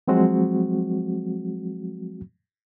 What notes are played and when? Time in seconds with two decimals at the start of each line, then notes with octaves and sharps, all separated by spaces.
0.08 F3 F#3 G#3 C4 F#4